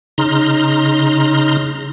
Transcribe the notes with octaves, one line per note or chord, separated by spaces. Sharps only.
C#3 D#4 A#5 C6 F6